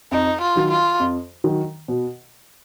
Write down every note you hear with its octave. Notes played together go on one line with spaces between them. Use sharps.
F2 D#4
F4
D#3 F#3
F4
F2
D#3 F#3
B2